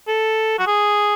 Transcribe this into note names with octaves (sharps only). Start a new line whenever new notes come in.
A4
F#4
G#4